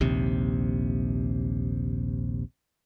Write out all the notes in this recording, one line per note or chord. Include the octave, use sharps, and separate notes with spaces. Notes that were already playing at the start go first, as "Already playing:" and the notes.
A#1 D#2 C3